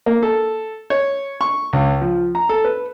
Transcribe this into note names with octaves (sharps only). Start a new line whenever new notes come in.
A#3
A4
C#5
C#6
C#2
F3
A#5
A4
B4